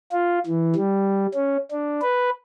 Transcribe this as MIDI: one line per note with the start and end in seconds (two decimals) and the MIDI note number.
0.12 0.39 65
0.46 0.75 52
0.76 1.26 55
1.34 1.57 61
1.71 2.01 62
2.02 2.30 71